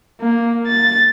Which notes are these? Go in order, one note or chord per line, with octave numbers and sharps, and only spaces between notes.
A#3
A6